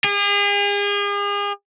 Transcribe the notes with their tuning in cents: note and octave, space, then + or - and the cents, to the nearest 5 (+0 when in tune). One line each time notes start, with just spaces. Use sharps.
G#4 -40